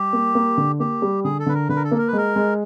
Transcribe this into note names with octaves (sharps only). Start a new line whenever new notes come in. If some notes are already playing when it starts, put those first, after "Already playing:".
Already playing: G3 G4
A#3
A#3
D3
A#3 G4
G3
D3 G#4
A4
D3 B4
A#4
D3 B4
A#4
A4
A#3
A#4
B4
G#3 A#4
G#3